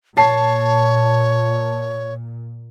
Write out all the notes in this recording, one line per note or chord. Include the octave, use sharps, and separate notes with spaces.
A#2 C#5 A5 C7